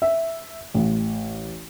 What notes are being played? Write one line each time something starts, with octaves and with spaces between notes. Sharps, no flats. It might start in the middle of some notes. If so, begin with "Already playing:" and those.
E5
A1